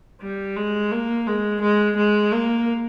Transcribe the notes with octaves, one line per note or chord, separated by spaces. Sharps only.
G3
G#3
A#3
G#3
G#3
G#3
A#3